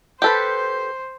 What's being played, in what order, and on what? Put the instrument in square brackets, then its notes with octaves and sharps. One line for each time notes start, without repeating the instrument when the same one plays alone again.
[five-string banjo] G4 A4 B4 [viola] C5